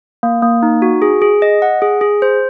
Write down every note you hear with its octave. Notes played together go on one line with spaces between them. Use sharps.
A#3
A#3
D#4
F#4
G#4
G#4
D#5
F#5
G#4
G#4
C5